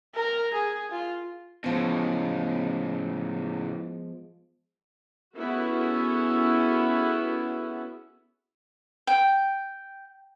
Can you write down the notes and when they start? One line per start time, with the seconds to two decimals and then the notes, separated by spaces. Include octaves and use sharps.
0.15 A#4
0.54 G#4
0.91 F4
1.64 A2 C#3 F3 G#3 B3
5.37 B3 C#4 E4 F#4 G#4 A4
9.07 G5